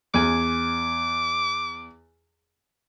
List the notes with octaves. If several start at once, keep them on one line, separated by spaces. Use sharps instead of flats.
E2 G#5 D6